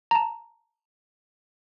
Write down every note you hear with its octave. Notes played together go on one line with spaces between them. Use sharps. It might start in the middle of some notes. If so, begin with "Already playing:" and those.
A5 A#5